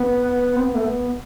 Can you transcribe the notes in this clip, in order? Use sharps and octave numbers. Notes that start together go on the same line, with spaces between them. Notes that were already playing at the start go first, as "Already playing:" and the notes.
Already playing: B3
C4
B3
A3
B3